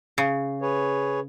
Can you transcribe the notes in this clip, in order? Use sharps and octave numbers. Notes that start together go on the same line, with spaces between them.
C#3
G#4 B4 C#5